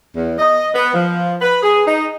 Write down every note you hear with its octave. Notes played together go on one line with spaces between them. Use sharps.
E2
D#5
B3
F3
B4
G#4
D#4